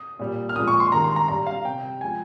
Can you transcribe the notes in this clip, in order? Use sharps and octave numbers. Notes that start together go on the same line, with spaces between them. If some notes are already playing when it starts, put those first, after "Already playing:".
Already playing: D#6
A#2 G3
F6
A#2 F3 G#3 D#6
C#6
C6
G2 D#3 G#3 A#5
C6
A#5
G2 G3 A#5
F5
C3 G3 G5
F3 G#3 G#5